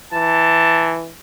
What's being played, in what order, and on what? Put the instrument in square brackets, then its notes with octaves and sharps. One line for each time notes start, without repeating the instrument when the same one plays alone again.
[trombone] E3 [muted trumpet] A5